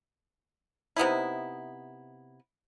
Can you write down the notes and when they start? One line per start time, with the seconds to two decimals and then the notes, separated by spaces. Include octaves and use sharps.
0.96 C3 B3 D#4 E4